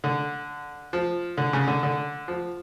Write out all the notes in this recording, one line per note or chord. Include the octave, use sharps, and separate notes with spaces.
D3
F3
D3
C#3
D3
D3
F3